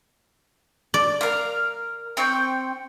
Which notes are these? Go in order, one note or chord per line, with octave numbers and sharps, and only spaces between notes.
D5
A#4 F5
C4 G5 C#6